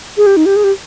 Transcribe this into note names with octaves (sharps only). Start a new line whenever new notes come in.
G#4
G4
D#4
G4
G#4
G4